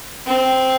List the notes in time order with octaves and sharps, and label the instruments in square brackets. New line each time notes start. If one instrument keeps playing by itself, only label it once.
[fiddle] C4